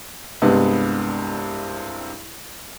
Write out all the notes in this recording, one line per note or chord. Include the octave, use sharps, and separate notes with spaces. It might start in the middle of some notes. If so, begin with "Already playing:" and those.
C2 G2 C3 G#3 B3